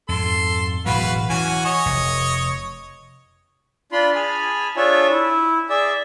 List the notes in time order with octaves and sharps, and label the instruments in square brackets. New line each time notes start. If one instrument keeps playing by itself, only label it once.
[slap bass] F2 G#2 [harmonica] A4 C6
[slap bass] E1 A2 F#3 [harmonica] F#4 B4 F5
[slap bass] E3 [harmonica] C#4 F#4 G#5
[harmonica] C#5 D#5
[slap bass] F1
[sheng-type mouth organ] D4 F4 B5 C6
G#4 G#5 A5 B5 F6
D4 F4 G#4 C#5 E5
E4
G#4 D5 E5